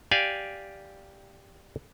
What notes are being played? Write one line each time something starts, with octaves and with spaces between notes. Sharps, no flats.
G4 D5 F5 G#5